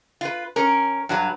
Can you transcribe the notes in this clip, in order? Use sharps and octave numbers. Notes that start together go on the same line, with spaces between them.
F4 B4
C#4 A#4
G2 F#3 B4